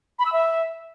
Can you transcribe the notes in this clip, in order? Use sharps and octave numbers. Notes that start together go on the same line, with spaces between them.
B5
E6
E5